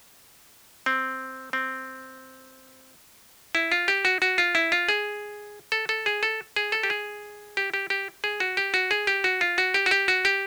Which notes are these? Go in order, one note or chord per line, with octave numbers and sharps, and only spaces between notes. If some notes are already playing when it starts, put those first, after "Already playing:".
C4
C4
E4
F4
G4
F#4
F#4
F4
E4
F4
G#4
A4
A4
G#4
A4
G#4
A4
G4
G#4
G4
G4
G4
G#4
F#4
G4
F#4
G#4
G4
F#4
F4
F#4
G4
F#4
G4
F#4
G4